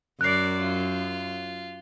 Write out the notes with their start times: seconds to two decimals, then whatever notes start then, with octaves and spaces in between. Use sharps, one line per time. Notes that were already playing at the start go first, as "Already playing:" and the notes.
0.21 F#2 A#4 D5 F#6 C7
0.59 F4